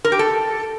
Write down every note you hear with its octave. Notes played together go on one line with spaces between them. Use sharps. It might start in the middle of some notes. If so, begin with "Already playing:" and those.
A#4
G4
A4